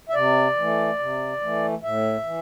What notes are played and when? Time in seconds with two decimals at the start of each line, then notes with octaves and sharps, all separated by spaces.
0.09 E5
0.14 C3 D5
0.57 E3 A3
0.99 C3
1.41 E3 A3
1.83 A2 E5
2.25 E3